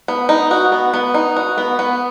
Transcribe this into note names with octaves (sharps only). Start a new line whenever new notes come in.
B3
D#4
F#4
B3
B3
D#4
F#4
B3
B3